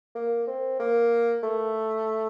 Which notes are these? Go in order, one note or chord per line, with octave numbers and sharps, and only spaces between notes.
A#3
C4
A#3
A3